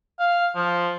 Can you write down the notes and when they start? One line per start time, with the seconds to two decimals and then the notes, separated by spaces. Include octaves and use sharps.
0.19 F5
0.56 F3